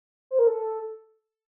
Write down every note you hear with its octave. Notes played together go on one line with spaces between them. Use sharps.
C5
A#4
A4